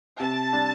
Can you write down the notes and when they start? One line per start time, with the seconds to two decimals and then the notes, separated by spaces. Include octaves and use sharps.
0.20 C3 A5
0.53 G3 D4